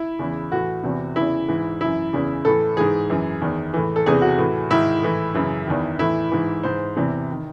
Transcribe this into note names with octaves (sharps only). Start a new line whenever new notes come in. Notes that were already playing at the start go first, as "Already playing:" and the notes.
Already playing: E4
E2 C#3 E3
A2 E3 F#4
E2 C3 E3
E2 C#3 E3 E4
G#2 E3
F#2 E3 E4
E2 C#3 E3
A2 E3 A4
G#2 E3 G#4
F#2 E3
E2 D#3
A2 E3
A4
E2 C3 E3 G#4
F#4
A2 E3
G#2 D#3 E4
A2 E3
F#2 C#3 E3
E2 D#3
A2 E3 E4
G#2 E3
G#2 E3 C5
E2 C3 E3
D#3